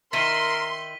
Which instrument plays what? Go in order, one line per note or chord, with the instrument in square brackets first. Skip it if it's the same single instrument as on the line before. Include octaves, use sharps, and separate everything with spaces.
[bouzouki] D#3 E4 [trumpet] A#4 [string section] C6 [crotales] B6 D#7 G7